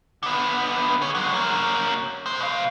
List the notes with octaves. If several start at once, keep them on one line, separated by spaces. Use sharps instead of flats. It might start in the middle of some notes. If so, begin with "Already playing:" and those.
D3 B3
G#4 C#5
F#3 G#3
A#3 C#4
G#3 C5
B2 F5